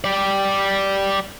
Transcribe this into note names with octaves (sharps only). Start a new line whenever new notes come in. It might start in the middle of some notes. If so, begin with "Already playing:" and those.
G4 D5